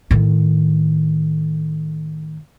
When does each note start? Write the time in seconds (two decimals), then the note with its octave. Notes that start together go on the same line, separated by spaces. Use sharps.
0.11 A2 D#3